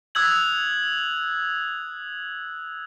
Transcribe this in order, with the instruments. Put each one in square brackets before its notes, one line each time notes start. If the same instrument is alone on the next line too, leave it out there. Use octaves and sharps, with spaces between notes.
[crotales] D#6 E6 F#6 G#6 F#7